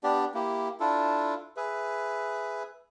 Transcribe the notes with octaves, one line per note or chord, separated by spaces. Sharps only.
B3 D4 G4 D5
A#3 E4 G4
D4 E4 F4 A4
G#4 B4 E5